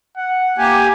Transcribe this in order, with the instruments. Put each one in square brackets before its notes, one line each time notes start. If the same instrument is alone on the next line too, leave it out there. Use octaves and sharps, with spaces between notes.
[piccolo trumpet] F#5
[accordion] A#3 G4 [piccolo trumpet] G#5